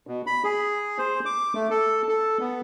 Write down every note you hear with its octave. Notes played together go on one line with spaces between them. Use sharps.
B2
B5
G#4
C5
D6
A3
A4
A4
B3